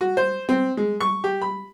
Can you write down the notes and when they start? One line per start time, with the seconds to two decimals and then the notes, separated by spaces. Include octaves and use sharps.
0.01 F#4
0.17 C5
0.49 C4
0.77 G#3
1.00 C#6
1.24 G4
1.42 B5